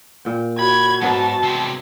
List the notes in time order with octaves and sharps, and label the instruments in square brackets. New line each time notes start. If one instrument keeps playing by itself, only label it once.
[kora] A#2 G5
[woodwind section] F#4 [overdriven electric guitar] B5 [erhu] G#6
[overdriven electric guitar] G#2 [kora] F#3 B3 D4 [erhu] A5
[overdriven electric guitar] C3 G#3